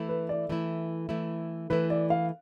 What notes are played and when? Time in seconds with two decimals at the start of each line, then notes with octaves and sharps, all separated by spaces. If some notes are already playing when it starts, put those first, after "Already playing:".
Already playing: E3 A3 E4
0.09 B4
0.29 D5
0.49 E3 A3 E4
1.09 E3 A3 E4
1.70 E3 A3 E4 B4
1.90 D5
2.10 F5